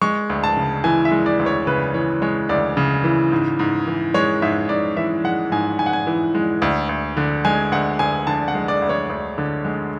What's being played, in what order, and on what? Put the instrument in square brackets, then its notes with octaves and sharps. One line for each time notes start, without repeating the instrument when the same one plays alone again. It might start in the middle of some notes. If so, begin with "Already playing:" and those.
[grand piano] G#3 C#6
D2
A5
C#3
E3 G#5
E5
G#3
D5
D2
C#5
C#3 B4
E3 C#5
G#3 C#5
D2 D5
C#3
E3
G#2
G#2
E3
G#3 C#5
G#2 E5
G#2 D5
E3 E5
G#3 F#5
G#2 G#5
G#2 G#5
F#5
G#5
E3
G#3
D2
D2
D3
G#3 G#5
D2 F#5
D2 G#5
D3 A5
F#5
G#3
D5
D2
C#5
D2
D3
G#3